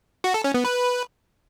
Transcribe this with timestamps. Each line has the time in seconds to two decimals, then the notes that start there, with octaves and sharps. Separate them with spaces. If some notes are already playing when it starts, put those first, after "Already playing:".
0.24 F#4
0.34 A4
0.44 C#4
0.54 B3
0.65 B4